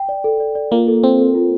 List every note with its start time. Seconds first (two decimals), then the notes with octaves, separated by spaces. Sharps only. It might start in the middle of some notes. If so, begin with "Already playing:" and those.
Already playing: G5
0.09 D5
0.24 A4
0.40 D5
0.55 D5
0.72 A#3 F4
0.87 A4
1.03 C4 A4
1.19 A4
1.35 F4